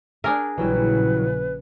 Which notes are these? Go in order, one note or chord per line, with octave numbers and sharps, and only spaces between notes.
D4 G#4 A#4 D5 E5
A#1 C#3 E3 F#3 G3 B4